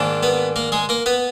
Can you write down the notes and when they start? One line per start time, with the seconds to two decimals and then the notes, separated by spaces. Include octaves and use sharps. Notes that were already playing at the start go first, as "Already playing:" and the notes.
Already playing: G#2 D#3 A#3 D4
0.23 B3 B4
0.56 A#3 A#4
0.72 G#3 G#4
0.89 A#3 A#4
1.06 B3 B4